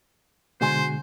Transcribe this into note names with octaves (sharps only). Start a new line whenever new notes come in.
B2 D3 G#3 F#4 C5 G#5 C6